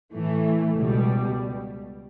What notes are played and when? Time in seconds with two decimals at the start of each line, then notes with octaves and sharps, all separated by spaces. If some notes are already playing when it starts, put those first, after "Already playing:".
0.13 A2 E3 A3
0.74 C#2 B2 G3